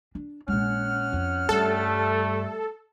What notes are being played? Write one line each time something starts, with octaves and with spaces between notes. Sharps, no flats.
D4
A#1 G#3 C#4 F#5 F6
F2
G2 G3 A3 A4